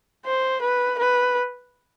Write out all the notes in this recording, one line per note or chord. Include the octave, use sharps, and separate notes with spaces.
C5
B4
B4